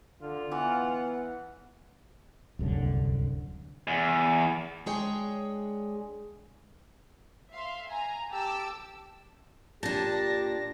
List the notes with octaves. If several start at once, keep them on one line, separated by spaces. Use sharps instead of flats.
D3 F4
E3 B3 F#5
D1 C2 F#2 D3
E2
G#3 D4 G#4 C#5 G5
E5 F5 C6
G#5 A#5
G4 G5 A5 D6 E6
A#2 D4 G4 A5 A#6